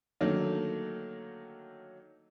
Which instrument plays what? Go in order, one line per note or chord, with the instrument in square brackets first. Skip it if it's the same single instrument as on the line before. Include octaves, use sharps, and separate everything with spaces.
[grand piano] D3 D#3 F#3 A3 A#3